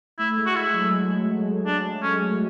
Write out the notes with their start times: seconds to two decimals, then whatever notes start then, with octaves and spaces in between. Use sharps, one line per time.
0.19 A3 E4
0.37 G#3
0.46 F#4
0.55 G#3 E4
0.74 F#3
0.83 G#3
0.93 F#3
1.66 D4
2.02 C#4